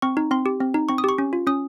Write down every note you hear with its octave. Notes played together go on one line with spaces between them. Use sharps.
C4 C#6
D#4
C4 C6
G4
C4
D#4
C4 C#6
D#6
G4 C#6
C#4
F4
C#4 D#6